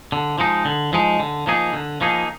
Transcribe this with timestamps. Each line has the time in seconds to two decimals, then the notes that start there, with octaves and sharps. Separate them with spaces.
0.12 D3
0.38 F3 G#3 D#4
0.65 D3
0.93 F3 G#3 D#4
1.20 D3
1.47 F3 A#3 D#4 G#4
1.73 D3
2.01 F3 A#3 D#4 G#4